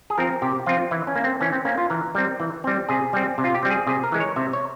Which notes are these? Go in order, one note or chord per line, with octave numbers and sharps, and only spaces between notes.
G#4
F3 C4 A#4
C3 G4
F3 C4 F4
E3 E4
C#4
A#3
C4
E3 C#4
C4
A#3 C#4
F4
E3 A#4
G3 C4
E3
G3 C4
C3 G#4
G3 C4
C3
F4
G4
G3 C4
G#4
C3 G#4
A#4
E3 G#3
C#5
C3 E5
C#5